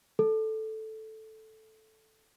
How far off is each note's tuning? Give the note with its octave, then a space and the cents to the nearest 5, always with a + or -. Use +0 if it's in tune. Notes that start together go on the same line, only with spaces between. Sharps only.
A4 -5